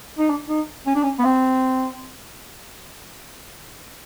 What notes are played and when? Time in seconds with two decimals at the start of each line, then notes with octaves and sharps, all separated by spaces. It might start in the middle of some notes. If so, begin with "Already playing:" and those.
0.18 D#4
0.30 D4
0.49 D#4
0.86 C#4
0.95 D4
1.03 C#4
1.19 B3
1.24 C4